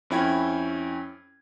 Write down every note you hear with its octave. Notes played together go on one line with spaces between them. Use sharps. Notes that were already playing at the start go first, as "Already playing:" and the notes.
F2 C#4 E4 G5 G#6